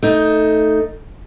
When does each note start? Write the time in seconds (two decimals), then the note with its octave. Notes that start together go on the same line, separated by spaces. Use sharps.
0.03 A3 D#4